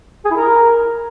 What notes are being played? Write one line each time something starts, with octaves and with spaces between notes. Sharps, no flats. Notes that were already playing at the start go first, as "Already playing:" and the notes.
G#4
E4
A#4